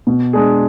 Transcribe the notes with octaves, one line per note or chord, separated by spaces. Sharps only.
B2
G#3 D4 G#4